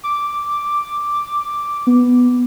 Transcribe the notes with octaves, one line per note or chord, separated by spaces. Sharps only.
D6
B3